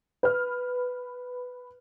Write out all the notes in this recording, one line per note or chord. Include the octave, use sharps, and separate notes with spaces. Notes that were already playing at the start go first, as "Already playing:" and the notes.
B4 F6